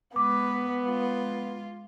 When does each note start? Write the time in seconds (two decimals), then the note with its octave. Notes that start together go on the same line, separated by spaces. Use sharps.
0.16 G#3 B3 B4 D6
0.83 G#3 F4